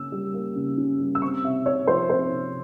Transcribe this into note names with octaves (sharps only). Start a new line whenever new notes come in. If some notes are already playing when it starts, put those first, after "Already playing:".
Already playing: C#3 A#3 C#4 E6
G3
A#3
C#3
C#4
G3
E6
C4 C#6
C3 E5
C3 C#5
F3 C5
C4 C5
C3